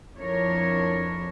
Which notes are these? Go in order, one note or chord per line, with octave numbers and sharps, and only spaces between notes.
F2 D4 E4 A#4 C#5